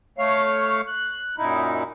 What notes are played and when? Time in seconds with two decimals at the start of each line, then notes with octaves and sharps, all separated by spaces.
0.18 A3 C#5 F5
0.87 F#6
1.38 F#2 A#2 D#4 E4